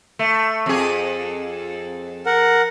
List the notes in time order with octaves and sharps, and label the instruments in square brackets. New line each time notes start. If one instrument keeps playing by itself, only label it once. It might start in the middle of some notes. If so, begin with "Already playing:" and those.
[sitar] A3
F2 G#4
[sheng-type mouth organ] A#4 F#5